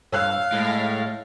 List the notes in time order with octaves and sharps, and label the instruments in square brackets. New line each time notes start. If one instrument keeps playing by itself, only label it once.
[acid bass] G2 [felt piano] C#5 E6 F#6 [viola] F5
[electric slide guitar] A2 [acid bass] G#3